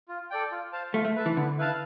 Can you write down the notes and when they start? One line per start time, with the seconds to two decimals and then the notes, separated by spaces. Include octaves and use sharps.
0.08 F4
0.31 A4 D5 G5
0.51 F4
0.73 C5 F5 A5
0.94 A3 F4
1.05 A3
1.16 B4 E5 A5
1.26 E3
1.37 D3 B3
1.58 E4 B4 F5 A5